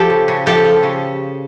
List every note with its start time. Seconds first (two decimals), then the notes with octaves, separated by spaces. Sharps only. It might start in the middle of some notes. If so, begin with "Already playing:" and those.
Already playing: F3 G4 A4
0.10 C#3
0.28 C#3
0.46 F3 G4 A4
0.65 F3
0.83 C#3